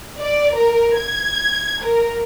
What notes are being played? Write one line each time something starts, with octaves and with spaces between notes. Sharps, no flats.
D5
A#4
G#6
A#4